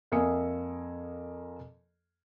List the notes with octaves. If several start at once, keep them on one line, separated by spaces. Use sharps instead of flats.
F2 A#3 E5 G#5 D#6 C#7